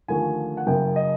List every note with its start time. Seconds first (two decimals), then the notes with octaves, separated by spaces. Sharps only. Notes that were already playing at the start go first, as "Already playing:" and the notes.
0.08 D#2 D3 F3 A3 G#5
0.57 F#5
0.66 F#1 F#2 C#3 G5
0.96 D#5